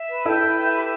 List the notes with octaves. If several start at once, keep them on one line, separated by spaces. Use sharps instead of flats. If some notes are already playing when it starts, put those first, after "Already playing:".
Already playing: E5
B4
E4 A4 G5
B4
E5
G4